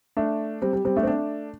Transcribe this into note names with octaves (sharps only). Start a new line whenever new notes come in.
A3 D4
G3 C4
G3
G3 C4
A3 D4
C4
A3 D4